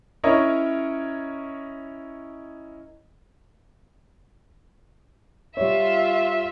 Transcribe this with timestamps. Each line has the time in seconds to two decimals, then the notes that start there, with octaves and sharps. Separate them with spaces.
0.24 C#4 E4 A#4 C#5 D#5
5.57 G3 F4 C#5 E5